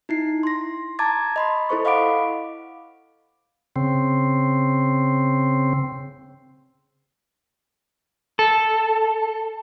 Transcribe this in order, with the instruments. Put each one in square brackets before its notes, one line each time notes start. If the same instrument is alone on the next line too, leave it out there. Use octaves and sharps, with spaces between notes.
[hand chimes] D#4 E4 C7
C6 A#6
A5 A#5 D6 G#6 A6
D#5 B5 C6
E4 A4 C5 C#6
D#5 F5 F#5 B5 D6 D7
[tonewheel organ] C#3 C4
[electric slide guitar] A4